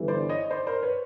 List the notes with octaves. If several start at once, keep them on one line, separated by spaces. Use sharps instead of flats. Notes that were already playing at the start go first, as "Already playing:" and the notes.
Already playing: G1 G2 E3
C5 D5
C#5 D#5
C5 D5
A#4 C5
B4 C#5